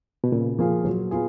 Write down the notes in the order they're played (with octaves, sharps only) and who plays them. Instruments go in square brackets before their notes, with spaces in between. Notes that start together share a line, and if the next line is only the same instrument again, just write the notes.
[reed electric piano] B2
[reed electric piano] A#2 [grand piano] C#3
[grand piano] F3 A#3 F4 G#4
F#3
B3 F4 G#4